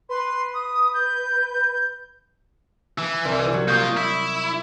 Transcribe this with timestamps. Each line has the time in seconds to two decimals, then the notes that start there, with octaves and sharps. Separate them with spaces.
0.09 B4 C6
0.54 D#6
0.93 G6
2.98 E3
3.25 C2
3.53 F#3 F#4
3.68 A#3 F4 C#6 D#6 G6
3.97 E4